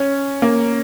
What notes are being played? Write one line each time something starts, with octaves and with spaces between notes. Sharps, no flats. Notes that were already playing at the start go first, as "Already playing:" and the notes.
Already playing: C#4
A#3